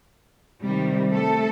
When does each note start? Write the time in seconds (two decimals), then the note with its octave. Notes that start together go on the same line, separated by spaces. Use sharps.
0.63 C3 D#3 G3
1.12 A3 A4